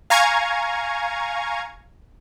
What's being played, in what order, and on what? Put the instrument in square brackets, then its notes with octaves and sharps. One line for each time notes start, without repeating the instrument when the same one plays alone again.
[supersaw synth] F5 G#5 A#5 C#6 G#6